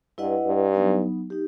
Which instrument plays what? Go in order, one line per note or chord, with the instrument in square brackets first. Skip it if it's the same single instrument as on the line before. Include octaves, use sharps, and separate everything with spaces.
[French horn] G2 [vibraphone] E4 B4 D#5 F#5
[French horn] G2
[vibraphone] F#3 B3 D#4
D#4 G4